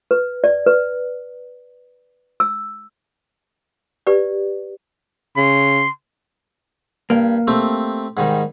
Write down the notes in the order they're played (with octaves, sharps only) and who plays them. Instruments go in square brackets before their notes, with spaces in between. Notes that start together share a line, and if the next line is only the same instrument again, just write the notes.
[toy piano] B4
D5
B4
E6
G4 B4 D5
[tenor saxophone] C#3 [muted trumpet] C6
[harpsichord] G2 [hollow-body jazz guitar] A#3
[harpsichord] A3 C4 G4
G#2 D#3 G3